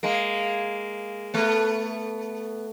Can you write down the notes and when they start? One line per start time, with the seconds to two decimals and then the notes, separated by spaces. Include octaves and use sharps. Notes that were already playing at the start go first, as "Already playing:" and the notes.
0.03 G#3 A#3
1.34 A3 B3